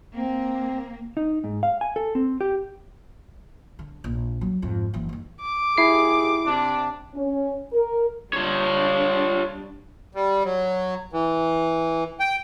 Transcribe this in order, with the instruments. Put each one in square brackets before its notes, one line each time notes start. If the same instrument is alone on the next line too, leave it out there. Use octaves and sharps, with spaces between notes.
[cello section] A#3 [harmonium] C4
[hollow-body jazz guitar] D#4
G#2
F5
G#5
A4
C4
G4
[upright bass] D3
A#1
F#3
F2 G#2
F#1 E3
D#3 E3
[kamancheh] D6
[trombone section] D#2 G4 G#4 [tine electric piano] E4 C7
[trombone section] C3 D4
[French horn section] C#4
A#4
[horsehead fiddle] G3 D4 [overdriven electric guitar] F4 C#5
[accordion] G3
F#3
E3
G5